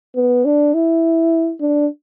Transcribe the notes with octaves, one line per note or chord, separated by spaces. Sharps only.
B3
D4
E4
D4